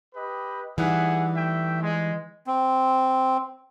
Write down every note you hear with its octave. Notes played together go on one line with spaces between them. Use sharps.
G4 B4 D#5
E3 G3 D#4 G#4 E5 F#5
A3 E5 G5
G#3
C4